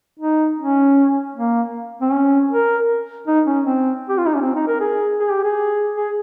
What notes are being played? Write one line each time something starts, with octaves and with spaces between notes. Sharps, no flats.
D#4
C#4
A#3
C4
C#4
A#4
D#4
C#4
C4
G4
F4
D#4
C#4
C4
D#4
A#4
G#4
G#4
G4
G#4
G#4